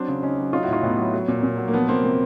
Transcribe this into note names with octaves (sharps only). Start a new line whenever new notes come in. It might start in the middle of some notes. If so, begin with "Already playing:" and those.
Already playing: F#3 C4 D4
C#3
C#3 C#4 D#4
F#3
F#3 D#4 F4
E4 F#4
A2 D#4 F4
A2 B3
F#3
F#3
A#2
A#2
F#3
A#3
F3 B3
C3 A#3 C4
C3 A#3